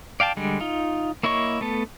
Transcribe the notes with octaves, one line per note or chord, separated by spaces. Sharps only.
D5 F5 G5 A5
D3 G3 G#3
D#4 F4
A#3 E4 C#5 D#5 C#6
A3 B3 A4